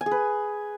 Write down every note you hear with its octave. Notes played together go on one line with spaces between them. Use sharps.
G#5
G#4
B4